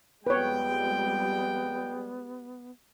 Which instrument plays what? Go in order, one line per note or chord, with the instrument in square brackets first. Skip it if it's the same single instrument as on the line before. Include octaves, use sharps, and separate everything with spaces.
[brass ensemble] F2 G5 [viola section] G3 G#3 [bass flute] B3 [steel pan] B4 C#5